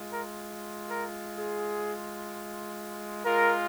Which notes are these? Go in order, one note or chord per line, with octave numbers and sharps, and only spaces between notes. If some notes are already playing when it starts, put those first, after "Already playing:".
Already playing: G#3 F4
A#4
A#4
G#4
G#3 F4 A#4